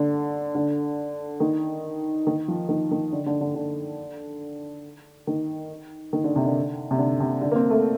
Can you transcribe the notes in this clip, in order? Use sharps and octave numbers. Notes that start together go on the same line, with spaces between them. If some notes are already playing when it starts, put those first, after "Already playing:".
Already playing: D3
D3
D#3
D#3
F3
D#3
D#3
D3
D3
D3
D3
D#3
D#3
D3
C3
D3
C3
D3
C3
D3
A#3
C4
A3